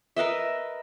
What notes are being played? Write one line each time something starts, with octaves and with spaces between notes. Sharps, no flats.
A#4 B4 D#5 E5